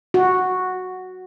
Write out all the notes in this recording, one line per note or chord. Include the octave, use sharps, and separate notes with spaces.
F#4